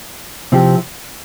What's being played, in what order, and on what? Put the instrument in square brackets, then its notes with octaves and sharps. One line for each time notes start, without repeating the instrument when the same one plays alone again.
[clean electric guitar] C3 F3 C4 E4 G4